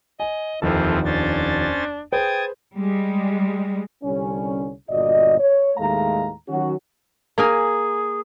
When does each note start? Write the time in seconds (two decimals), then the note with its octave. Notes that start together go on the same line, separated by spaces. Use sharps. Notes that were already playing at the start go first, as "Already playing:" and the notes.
0.20 D#5 G#5
0.62 D#1 F2 E3 F3 C4 D#4 A4
1.05 C#4 D4 C5 A6
2.12 G#4 B4 C5 G5 A5 D#6 G#6
2.77 G3 G#3
4.03 C2 D3 G3 C#4
4.89 G1 A#2 F#4 D5 D#5
5.39 C#5
5.77 D#2 A2 G#3 A3 F5 A#5
6.49 D#3 F#3 C#4 F#4
7.38 A#3 G#4 A#4 G#5